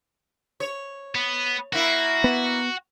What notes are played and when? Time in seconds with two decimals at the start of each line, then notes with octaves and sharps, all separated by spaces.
0.60 C#5
1.15 B3
1.73 A#3 E4 F#4
2.24 B3